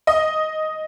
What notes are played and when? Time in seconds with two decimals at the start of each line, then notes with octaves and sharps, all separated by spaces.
0.07 D#5